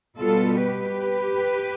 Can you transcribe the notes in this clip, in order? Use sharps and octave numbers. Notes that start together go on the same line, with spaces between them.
B2 G3 B3 F4 A4
G4 B4